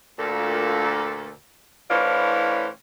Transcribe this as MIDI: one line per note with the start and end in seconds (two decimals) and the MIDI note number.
0.17 1.31 38
0.17 1.31 46
0.17 1.31 69
1.90 2.67 45
1.90 2.67 52
1.90 2.67 61
1.90 2.67 62
1.90 2.67 72
1.90 2.67 77